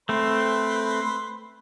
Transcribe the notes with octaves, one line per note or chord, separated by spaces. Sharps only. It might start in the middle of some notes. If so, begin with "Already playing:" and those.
A3 C4 B4 C5 C6